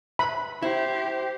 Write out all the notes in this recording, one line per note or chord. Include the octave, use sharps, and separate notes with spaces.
B5
E4 G4 C5